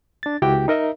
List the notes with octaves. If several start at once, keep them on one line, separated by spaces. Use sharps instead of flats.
D4 A6
C#2 E4 F#4 G4 G5
D#4 A#4 D#5 E5